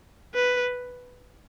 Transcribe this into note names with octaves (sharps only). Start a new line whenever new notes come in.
B4